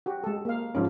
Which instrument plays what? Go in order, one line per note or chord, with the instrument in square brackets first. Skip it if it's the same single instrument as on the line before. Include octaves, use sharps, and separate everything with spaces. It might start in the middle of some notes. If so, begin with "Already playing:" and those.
[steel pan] F#4 G4
G#3 A4
A#3 F5
[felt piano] G#2 F3 C#4